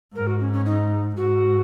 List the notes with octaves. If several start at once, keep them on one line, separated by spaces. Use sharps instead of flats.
G#2 A#4
F#4
C#4
C#4
D#4
G#2 F#4